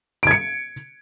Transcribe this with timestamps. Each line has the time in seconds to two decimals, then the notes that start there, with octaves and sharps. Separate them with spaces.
0.23 D7
0.27 G#6
0.31 C#7